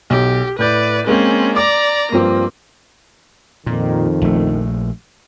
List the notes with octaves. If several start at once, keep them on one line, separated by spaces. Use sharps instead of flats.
B1 G4
A2 B4 D5 G6
G#3 A#3 C4 C#4
D5 A#5 D6
G2 F3 A#3 C4
F2 A#2 D#3
A#1 A3